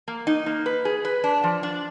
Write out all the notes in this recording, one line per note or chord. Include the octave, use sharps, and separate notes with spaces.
A#3
D#4
A#3
B4
G#4
B4
D4
F3
D4